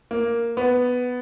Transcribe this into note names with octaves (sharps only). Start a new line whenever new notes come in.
A#3
B3